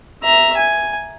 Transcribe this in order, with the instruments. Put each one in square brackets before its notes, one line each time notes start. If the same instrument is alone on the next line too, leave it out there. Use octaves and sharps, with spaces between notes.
[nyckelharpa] E5 A#5
G#5